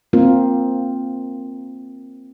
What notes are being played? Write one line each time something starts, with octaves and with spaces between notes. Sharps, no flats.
A#3 C4 F4 A#4